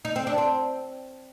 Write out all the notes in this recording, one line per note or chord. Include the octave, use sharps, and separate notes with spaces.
D#4
C4
D4
C4